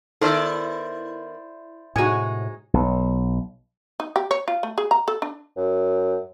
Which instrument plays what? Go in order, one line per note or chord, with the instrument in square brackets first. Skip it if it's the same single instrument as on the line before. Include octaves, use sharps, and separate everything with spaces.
[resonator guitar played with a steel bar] D#3 B3 [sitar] E4 C5 D5 [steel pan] A4
[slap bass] A2 C3 [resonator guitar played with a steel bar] G#3 D#4 [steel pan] F#4 G#5
[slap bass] B1
[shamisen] D#4
G4
C#5
F4
A3
G#4
A#5
A4
D4
[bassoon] F#2